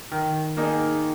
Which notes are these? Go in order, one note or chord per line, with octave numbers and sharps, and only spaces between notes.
D#3
A#3 D#4 G#4